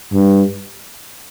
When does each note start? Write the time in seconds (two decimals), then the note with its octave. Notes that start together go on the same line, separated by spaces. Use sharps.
0.13 G2